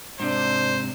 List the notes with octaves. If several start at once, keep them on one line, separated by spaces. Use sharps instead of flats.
G#2 C3 D4 C5